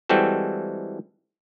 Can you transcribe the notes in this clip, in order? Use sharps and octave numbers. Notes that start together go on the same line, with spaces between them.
E3 G3 G#3 C4 F#4 A4